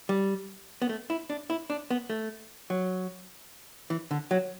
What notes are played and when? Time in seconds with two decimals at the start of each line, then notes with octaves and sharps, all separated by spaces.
0.09 G3
0.82 B3
0.89 A3
1.10 E4
1.30 D4
1.50 E4
1.70 D4
1.90 B3
2.10 A3
2.70 F#3
3.90 E3
4.11 D3
4.31 F#3